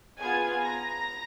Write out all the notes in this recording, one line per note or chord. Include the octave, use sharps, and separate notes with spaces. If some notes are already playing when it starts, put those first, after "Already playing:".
B3 F4 G#4 G#5 G#6
A#5 A#6